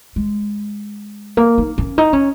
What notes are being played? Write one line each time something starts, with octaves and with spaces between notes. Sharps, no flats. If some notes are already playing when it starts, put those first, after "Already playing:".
G#3
A#3
D#4
C#4
D#4
C#4